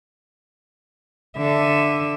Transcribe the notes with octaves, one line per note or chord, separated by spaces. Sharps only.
D3 E5